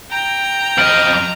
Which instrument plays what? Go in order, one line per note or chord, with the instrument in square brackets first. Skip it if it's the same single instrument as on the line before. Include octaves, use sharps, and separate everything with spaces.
[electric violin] G5 [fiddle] A#5
[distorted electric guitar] F2 D#5 [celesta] F6 D7 F#7